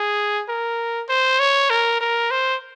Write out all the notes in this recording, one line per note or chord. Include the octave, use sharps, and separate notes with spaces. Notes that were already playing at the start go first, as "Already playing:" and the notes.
Already playing: G#4
A#4
C5
C#5
A#4
A#4
C5